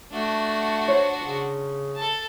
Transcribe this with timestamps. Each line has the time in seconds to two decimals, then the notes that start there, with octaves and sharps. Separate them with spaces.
0.12 A3 D4 F#4
0.88 C5 C#5
1.21 C#3 C5
1.95 A4 A5